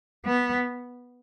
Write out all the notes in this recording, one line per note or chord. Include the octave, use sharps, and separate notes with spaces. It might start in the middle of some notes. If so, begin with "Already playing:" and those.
B3